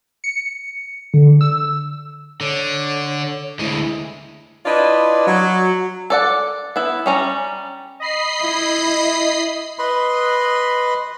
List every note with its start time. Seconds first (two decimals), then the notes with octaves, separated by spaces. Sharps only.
0.24 C#7
1.14 D3
1.41 E6
2.41 D3 C#5
3.59 D2 G#3 E4
4.66 D4 E4 F4 B4 D5 D#5
5.27 F#3
6.10 A4 D5 F#5
6.76 B3 E4
7.06 G3 C#4 A#5
8.00 D#5 B5 C7
8.43 E4
9.79 B4 D#5 B5 C6